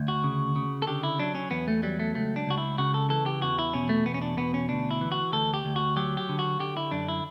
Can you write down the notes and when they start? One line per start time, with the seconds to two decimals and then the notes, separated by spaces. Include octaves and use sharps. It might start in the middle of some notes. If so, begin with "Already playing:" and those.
Already playing: D2
0.08 F#4
0.24 C#3
0.56 C#3
0.82 A4
0.87 D3 G4
1.03 E4
1.20 F#3 D4
1.35 C#4
1.51 E2 B3
1.68 A3
1.83 F#3 G3
2.00 A3
2.15 C#2 A3
2.36 D4
2.47 C#2 F#4
2.58 E4
2.78 C#3 F#4
2.94 A4
3.10 E3 A4
3.26 G4
3.42 E2 F#4
3.59 E4
3.74 B2 C#4
3.89 A3
4.05 E2 B3
4.14 C#4
4.22 D4
4.37 B2 B3
4.54 C#4
4.69 D2 D4
4.91 E4
5.01 E3
5.12 F#4
5.33 D2 A4
5.54 G4
5.65 D2
5.76 F#4
5.96 F#3 G4
6.17 G4
6.29 D3
6.39 F#4
6.60 D3 G4
6.77 E4
6.91 F#2 D4
7.08 E4